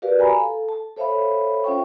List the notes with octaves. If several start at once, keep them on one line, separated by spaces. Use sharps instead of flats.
F#4 G4 A#4 B4 D5 F5
F5 G#5 A#5 B5
A4
A5
A4 C5 C#5 E5 F5 B5
C#4 F4 C5 E5 G5 C#6